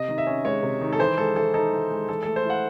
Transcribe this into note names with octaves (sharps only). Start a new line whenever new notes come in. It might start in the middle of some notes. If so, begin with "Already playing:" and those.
Already playing: C3 D#5
D#3
E5
C#4
G#3 C#5
C3
D#3
A4
E3 C5
G#3 A4
E3 A4
D#4 A4
E3
G#3
E3 A4
A3 A4
C5
E4 F#5